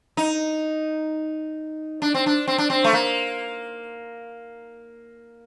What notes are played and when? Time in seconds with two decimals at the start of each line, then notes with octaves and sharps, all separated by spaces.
0.17 D#4
2.02 D4
2.14 C4
2.26 D4
2.48 C4
2.58 D4
2.70 C4
2.84 A3
2.93 A#3